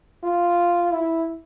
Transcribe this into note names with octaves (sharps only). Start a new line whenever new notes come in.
F4
E4